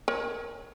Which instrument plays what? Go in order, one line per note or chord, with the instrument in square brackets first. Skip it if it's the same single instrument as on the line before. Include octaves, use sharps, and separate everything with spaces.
[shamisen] A#4 C#5